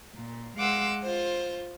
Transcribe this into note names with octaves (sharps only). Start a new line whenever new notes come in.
A#2
G#3 F5 F#5 C6 D6 E6
F4 C5